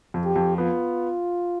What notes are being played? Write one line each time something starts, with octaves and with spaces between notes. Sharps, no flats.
F2
G4
F2
B3 F4